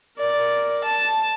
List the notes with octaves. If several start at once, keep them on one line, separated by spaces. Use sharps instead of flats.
A#4 D5
A5